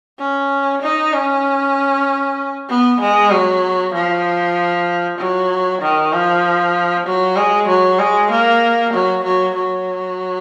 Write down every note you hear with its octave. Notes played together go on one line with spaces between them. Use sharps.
C#4
D#4
C#4
B3
G#3
F#3
F3
F#3
D#3
F3
F#3
G#3
F#3
G#3
A#3
F#3
F#3
F#3